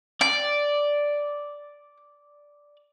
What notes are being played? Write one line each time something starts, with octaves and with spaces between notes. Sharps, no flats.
D5 D6